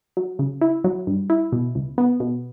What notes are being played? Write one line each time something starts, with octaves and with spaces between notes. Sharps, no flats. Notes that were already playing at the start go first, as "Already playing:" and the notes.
F#3
C#3
E4
F#3
G2
E4
B2
C#2
B3
B2